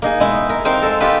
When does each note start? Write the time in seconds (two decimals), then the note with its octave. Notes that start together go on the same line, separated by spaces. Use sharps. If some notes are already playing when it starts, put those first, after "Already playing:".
0.02 A#3 D#4 G#4
0.20 B2 G#3 D#4 E4
0.49 A#4
0.65 C4 D#4 A#4 F5
0.82 G#3 A4
1.00 B3 D#4 F4 G4 A4 B4